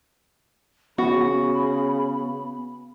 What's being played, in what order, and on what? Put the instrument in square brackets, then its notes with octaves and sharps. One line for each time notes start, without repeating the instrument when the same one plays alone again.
[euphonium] C#3 [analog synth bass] B3 [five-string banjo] F#4 [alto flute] B5